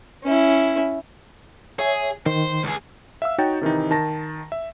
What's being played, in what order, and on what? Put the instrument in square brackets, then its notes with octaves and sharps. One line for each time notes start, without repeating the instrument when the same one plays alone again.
[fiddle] C#4 E4
[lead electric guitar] G#4 [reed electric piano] C#5 E5 G#5
[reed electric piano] D#3 [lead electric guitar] C5
[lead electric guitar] C#2 G#4
[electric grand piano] E5 F5 E6
D#4 F#4 C#5 G5 A6
C3 D#3 E3 D#4
D#3 A5 A#6
E5